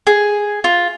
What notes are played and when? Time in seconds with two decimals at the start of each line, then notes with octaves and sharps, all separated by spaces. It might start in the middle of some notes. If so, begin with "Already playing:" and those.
0.07 G#4
0.64 F4